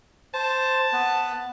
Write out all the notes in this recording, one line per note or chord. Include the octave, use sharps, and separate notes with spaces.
C5 A5
B3 B4